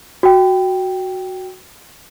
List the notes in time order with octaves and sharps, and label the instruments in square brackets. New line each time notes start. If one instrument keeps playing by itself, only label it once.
[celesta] F#4 G5